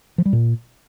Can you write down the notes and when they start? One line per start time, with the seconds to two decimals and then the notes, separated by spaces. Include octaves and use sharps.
0.18 F3
0.26 G3
0.33 A#2